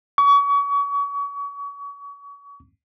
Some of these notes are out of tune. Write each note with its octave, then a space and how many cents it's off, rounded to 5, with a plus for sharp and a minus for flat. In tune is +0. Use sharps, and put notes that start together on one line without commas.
C#6 +35